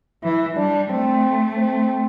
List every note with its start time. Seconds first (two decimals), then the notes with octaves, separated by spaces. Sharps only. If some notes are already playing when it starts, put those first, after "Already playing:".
0.23 E3 E4
0.57 G3 D4
0.90 A3 C4
1.57 C4